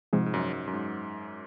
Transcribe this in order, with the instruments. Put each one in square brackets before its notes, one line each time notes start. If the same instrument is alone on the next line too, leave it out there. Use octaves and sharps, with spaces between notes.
[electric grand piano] G#2 [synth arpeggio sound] C3 F3 G#3
[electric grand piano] G#2
F#2
F#2
F#2
G#2